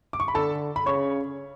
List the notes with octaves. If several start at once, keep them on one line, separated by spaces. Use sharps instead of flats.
D6
C#6
B5
D3 A4 A5
B5
C#3 C#5 C#6